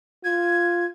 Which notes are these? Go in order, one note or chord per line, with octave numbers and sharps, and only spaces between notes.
F4 G#6